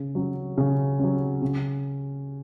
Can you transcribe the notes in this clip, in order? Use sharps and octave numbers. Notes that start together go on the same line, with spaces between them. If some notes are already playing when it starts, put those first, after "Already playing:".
Already playing: C#3
F#3 C#4
C#3
F#3 C#4
C#3